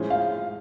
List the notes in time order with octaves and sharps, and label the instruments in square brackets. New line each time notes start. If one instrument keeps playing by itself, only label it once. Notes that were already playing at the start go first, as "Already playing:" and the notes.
Already playing: [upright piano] A2 F3 G#3 C#4
[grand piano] F5